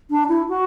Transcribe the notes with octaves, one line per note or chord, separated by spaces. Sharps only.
D4
E4
F#4